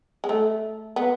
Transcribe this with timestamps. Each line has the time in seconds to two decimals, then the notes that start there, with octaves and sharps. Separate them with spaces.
0.24 G#3
0.29 A3
0.96 B3